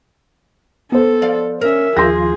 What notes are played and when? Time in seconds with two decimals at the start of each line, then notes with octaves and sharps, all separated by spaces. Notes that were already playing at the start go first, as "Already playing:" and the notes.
0.92 B3 A4 C5
1.22 F3 D5 F5
1.61 C#4 A#4 E5
1.97 D#2 F3 F4 G#4 C6 G6 A#6